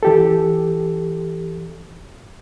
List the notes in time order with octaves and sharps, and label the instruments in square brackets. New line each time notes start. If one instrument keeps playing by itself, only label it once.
[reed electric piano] E3 G4 A4